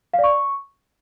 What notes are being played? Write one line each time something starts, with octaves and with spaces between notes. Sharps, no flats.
F5
D5
C#6